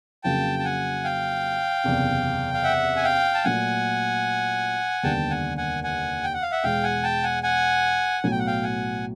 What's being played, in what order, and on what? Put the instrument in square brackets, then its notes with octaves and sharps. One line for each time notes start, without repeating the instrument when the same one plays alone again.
[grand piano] F2 C#3 F#3 A#3 [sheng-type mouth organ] G5 A5
[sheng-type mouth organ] A5
F#5 G#5
F5 G5
[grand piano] F#1 E2 C3
[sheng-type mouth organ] F5
E5 F#5
G#5
F5 G5
A5
[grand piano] A#2 F#3 A3 [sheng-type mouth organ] F#5 G#5
[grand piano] F1 D#2 D3 G3 B3 [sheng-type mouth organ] G5 A5
[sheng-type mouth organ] F#5 G#5
F#5 G#5
F#5 G#5
G5
F#5
F5
E5 F#5
[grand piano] E2 B2 G#3 [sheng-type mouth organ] F5 G5
[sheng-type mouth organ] F#5 G#5
G5 A5
F#5 G#5
F#5 G#5
[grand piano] B1 A2 F#3 [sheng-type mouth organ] G#5
[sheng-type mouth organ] G5
F#5
F5 G5
F#5 G#5